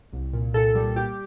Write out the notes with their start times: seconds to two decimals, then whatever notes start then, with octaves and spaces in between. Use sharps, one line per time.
0.13 C2
0.33 A#2
0.54 A#2 A4
0.75 G3
0.96 G3 G4